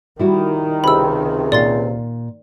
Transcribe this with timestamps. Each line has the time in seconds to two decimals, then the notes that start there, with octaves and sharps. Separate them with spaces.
0.19 D#3 G3 E4 F#4
0.84 C#2 C3 B5 E6
1.52 A#2 D5 F5 C6 A6